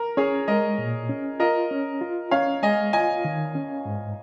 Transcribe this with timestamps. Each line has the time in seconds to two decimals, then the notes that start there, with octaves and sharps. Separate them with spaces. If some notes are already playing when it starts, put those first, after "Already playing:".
Already playing: A#4
0.17 C#4 G#4 C#5
0.48 G#3 A#4 D#5
0.78 A#2
1.09 C#4
1.40 F4 A#4 D#5
1.71 C#4
2.01 F4
2.31 C#4 C#5 F5
2.63 G#3 D#5 G#5
2.93 F4 D#5 G#5
3.25 D#3
3.55 C#4
3.85 G#2